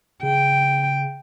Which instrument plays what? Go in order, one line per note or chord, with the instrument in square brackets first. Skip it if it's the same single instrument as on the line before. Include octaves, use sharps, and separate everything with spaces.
[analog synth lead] C#3 [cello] G5